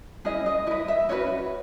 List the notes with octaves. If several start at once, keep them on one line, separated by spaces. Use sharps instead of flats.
C#4 E4 G#4 D#5
D#5
E4 B4 D#5
E5
C#4 F#4 B4 C#5